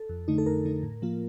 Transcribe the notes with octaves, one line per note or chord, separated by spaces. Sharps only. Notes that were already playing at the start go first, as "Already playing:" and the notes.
Already playing: A4
F2
D3 A3 D#4
A4
F2 A#4
D3 A3 D#4
A2
F3 A#3 F4